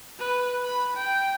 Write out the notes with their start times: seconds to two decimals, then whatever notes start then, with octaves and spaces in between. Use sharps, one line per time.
0.19 B4
0.65 B5
0.97 G5